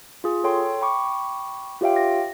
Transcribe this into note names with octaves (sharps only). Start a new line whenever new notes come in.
F4 G#4
A4 C#5 G5 C6
G5 B5 C#6 D6
F4 G4 C#5 E5 F5 G5
A#6